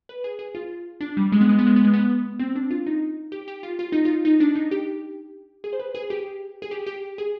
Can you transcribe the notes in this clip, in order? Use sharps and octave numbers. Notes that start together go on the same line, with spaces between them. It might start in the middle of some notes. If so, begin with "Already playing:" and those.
B4
G#4
G#4
F4
D4
G3
G#3
B3
G#3
B3
G#3
B3
G#3
B3
C4
D4
F4
D#4
G4
G4
F4
F4
D#4
F4
D#4
D4
D#4
G4
G#4
C5
B4
G#4
G4
G#4
G4
G4
G#4